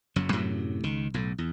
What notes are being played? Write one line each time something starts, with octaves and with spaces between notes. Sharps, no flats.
F#1 F#2 F#3
F#2 A2 C3 F#3
C#2 D#3
B1 A2
E2